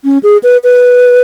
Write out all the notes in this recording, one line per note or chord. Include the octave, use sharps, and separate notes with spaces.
C#4
G#4
B4
B4